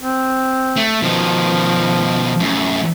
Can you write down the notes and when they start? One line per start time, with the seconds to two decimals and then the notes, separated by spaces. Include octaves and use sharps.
0.01 C4
0.76 A3
1.02 B2 D#3 F3
2.40 F#2 A2